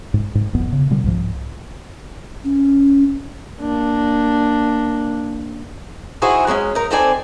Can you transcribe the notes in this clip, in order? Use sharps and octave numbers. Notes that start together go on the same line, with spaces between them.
G#2
G#2
D#1 A1 F2 B3
C#3
B2 D3 G3
C2 G#2 F3
C#4
A#3 D4
D#4 E4 F#4 G#4 C5
F#3 G#3 C4 C#4
D#4 A#4
C4 D#4 A4 C5 D5 G#5